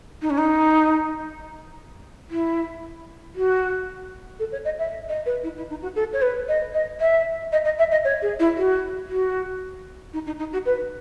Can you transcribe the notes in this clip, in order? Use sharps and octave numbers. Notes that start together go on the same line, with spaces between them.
D#4
C#4
D#4
E4
F#4
A4
C#5
D#5
E5
D#5
B4
E4
E4
D#4
F#4
A4
C#5
B4
D#5
D#5
E5
D#5
D#5
E5
D#5
C#5
G#4
E4
F#4
F#4
D#4
D#4
D#4
F#4
B4